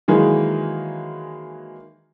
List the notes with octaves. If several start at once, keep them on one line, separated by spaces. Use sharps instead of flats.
D#3 E3 F#3 G#3 A#3